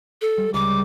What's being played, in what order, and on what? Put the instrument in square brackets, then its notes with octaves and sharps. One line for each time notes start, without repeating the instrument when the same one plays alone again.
[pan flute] A4
[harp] G3
[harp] C#2 [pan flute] D6